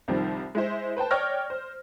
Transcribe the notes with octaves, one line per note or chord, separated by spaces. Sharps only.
C2 D#3 F3 G3
G#3 E4 C5
B4 C5 G5 A5
C#5 D5 G5 C#6 F6 A#6
C5